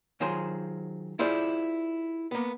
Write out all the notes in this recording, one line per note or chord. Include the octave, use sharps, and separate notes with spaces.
D#3 F#3 F4 G#4 C5
E4 F4 G#4 C5 D5
A#3 B3